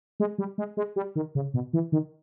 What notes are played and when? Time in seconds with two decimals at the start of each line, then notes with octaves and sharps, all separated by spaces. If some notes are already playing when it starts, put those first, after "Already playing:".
0.20 G#3
0.38 G3
0.58 G#3
0.77 G#3
0.96 G3
1.15 D#3
1.35 C#3
1.54 B2
1.73 E3
1.92 D#3